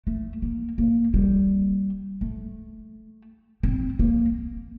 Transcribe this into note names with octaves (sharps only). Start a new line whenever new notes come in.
A3
A#3
A#3
G3
A3
C4
A#3